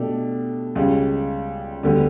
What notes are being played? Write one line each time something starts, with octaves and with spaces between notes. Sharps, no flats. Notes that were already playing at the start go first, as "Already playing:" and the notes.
Already playing: B2 A3 D4 G4
C#2 C#3 G3
D2 D3 G3 B3